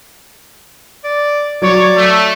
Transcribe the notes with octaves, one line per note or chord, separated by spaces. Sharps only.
D5
F#3 C#5 D5
A3